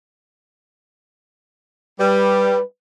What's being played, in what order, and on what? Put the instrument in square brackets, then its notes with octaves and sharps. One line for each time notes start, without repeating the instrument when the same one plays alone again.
[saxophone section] G3 [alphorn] B4